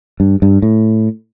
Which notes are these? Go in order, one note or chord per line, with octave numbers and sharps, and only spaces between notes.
G2
G2
A2